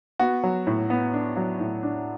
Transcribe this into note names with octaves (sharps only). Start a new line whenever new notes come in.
B3 F#4
F#3
A2
B3
D4
F#3
A2
D4